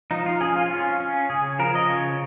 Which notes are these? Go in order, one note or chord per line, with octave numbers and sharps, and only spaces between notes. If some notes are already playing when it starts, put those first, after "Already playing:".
F3 D#4
F4
C#4 G#4
F4
C#4 F4
C#4
C#3 G#4
F3 A#4
D#5
C#3 C#5